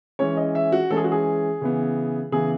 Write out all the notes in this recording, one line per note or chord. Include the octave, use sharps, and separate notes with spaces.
E3 G#3 C#4 C#5
D#5
E5
F#4
E3 G#3 C#4 A4
G#4
F#4
G#4
C#3 E3 B3
C#3 E3 B3 G#4